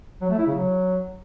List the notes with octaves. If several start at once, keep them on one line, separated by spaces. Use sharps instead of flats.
F#3
A3
E4
C#3
F#3